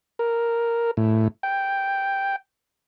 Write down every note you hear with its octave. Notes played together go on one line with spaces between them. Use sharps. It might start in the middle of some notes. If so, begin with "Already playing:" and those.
A#4
A2
G5